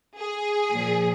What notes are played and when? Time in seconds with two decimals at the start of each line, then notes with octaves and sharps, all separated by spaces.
0.17 G#4
0.71 A#2 F3